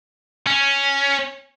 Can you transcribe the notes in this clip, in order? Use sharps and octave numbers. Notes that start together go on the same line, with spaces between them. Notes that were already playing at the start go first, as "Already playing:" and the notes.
C#4